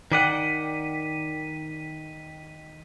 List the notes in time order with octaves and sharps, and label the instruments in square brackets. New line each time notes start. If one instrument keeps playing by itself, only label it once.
[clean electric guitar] D#3 D5 F#5 [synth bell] G5 B6 D#7